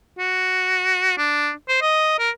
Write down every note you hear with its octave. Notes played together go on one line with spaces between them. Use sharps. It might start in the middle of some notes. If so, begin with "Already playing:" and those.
F#4
D4
C5
D#5
A#4